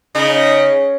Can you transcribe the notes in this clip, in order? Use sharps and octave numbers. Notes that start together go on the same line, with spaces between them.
C#3 D#4